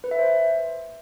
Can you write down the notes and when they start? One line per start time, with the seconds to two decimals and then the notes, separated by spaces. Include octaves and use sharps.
0.04 B4
0.11 E5
0.19 C5